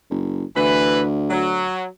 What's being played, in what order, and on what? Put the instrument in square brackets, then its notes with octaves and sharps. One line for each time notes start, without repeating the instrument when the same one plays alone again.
[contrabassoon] F#1
[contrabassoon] D2 [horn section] E3 B4
[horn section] F#3